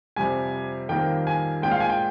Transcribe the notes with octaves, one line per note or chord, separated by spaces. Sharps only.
F2 C3 G3 G#5
F2 D#3 G3 A#3 G5
G#5
A#2 F3 G#3 G5
F5
G#5
G5